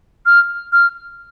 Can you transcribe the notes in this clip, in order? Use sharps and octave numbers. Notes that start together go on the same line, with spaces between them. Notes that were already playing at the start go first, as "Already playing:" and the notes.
F6
F6